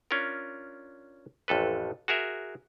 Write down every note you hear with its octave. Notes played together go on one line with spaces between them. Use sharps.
C#4 D4 F4 A#4
A1 F2 A4 B4
F#4 G#4 A#4 E5